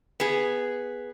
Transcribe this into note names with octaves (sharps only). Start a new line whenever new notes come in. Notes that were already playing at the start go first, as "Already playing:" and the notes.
B3 G#4